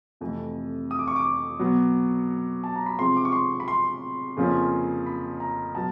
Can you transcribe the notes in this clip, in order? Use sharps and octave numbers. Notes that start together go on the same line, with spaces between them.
F2 C3 E3 A3
D#6
D6
C#6
D6
B2 F#3 B3
A5
A#5
B5
C3 F3 G#3 C4 C6
D6
C#6
C6
B5
C6
F2 C#3 F3 A#3 C#4
B5
A#5
B2 F#3 B3 A5